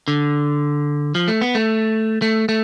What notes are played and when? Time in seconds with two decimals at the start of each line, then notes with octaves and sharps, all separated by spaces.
0.08 D3
1.15 F3
1.28 A3
1.41 B3
1.55 A3
2.22 A3
2.49 A3